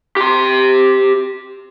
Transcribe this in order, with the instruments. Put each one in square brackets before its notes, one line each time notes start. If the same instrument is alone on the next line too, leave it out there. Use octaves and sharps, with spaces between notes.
[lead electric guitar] G4 C6